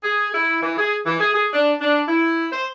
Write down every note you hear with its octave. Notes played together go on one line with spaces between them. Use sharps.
G#4
E4
E3
G#4
E3
G#4
G#4
D4
D4
E4
C5